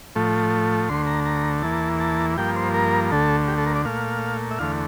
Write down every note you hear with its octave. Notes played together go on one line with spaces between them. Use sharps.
A2 F3 A3
D2 D3 A3 C6
A#5
A#5
E2 E3 A#3 A5
A5
G2 F3 A#3 G5
C5
A#4
D2 D3 A3 A4
G4
A4
A#4
D5
A#2 A3 F5
E5
E2 D3 A3 F5